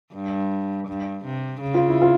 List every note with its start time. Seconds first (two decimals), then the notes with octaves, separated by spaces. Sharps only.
0.14 G2
0.87 G2
1.25 C3
1.61 C#3
1.74 F4
1.89 E4
2.02 F4